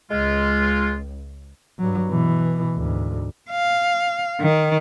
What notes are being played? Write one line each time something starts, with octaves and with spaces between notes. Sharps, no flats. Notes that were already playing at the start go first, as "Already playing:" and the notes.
C#2 G#3 F4
G2 F#3
B2 E3
D2 G#2
F5
D#3